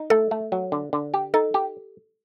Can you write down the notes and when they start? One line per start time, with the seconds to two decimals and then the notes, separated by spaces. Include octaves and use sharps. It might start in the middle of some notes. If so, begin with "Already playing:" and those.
Already playing: D#4
0.10 A3 A4
0.31 A3
0.52 F#3
0.72 D3
0.93 D3
1.14 G4
1.34 D#4 A4
1.54 G4